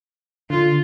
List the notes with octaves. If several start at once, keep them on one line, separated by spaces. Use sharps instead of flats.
D3 F4